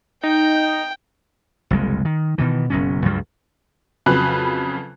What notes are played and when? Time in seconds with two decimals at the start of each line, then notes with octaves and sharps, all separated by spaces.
0.23 D#4 G5
1.70 F#1 C2 G#3
2.05 D#3
2.38 B2 D#3 E3
2.70 F#1 F#2 B2 C#4
3.05 C#2 G2 F#3 G3
4.06 F2 C#3 F#3 B4 F#6